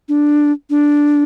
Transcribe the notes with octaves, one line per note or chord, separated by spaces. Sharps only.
D4
D4